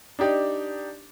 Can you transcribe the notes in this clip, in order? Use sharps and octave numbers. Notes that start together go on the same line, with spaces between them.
D4 D#4 G4 D5